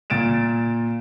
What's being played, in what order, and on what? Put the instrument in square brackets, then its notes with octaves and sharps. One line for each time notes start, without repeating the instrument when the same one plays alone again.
[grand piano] A#2 A6 D7 E7